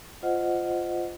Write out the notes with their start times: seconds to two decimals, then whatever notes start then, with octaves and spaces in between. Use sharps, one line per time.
0.23 F4 C5 D#5 F#5